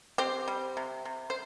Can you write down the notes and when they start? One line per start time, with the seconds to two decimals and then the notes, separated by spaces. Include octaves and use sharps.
0.18 C4 G4 C5
0.48 G3
0.77 C3
1.05 C3
1.30 C5